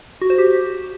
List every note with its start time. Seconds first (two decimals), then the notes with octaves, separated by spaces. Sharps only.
0.21 F#4
0.30 C5
0.38 G4